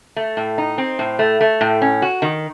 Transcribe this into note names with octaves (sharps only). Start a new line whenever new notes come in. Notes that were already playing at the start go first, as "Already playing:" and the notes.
A3
A2
D#4
C4
A2
A3
A3
A2
C#4
F#4
D#3